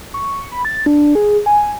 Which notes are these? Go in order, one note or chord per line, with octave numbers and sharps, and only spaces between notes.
C#6
B5
A6
D4
G#4
G#5